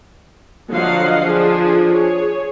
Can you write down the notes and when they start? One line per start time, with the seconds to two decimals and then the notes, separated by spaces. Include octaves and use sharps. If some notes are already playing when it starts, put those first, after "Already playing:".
0.70 D3 F3 F#3 D#5 F5 F#5
1.23 F3 D4 G#4
1.93 G#4 C#5